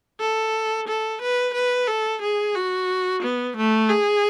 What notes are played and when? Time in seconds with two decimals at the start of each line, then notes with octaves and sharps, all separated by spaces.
0.20 A4
0.88 A4
1.22 B4
1.54 B4
1.87 A4
2.22 G#4
2.55 F#4
3.23 B3
3.56 A3
3.89 G#4